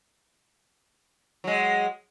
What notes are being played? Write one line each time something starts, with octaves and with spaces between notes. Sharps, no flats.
F#3 G#3